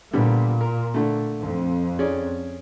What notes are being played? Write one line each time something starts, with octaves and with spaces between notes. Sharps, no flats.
A#2 D3 G3 B3
A#4
D3 A3
F2
C#4 G#4 D5